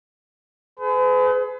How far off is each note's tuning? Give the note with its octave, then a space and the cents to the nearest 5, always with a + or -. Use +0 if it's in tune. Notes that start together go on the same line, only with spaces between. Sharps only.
G#4 +30 B4 +45